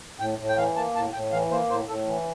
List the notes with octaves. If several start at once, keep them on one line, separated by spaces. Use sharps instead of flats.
A2 G5
A2
G5
E3 F5
A#3 A5
A2 A5
A2 G5
E3 F5
A#3 C5
A2 C5
A2 A4
E3